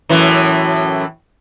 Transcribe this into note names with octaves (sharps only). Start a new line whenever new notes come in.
F#2 A2 E3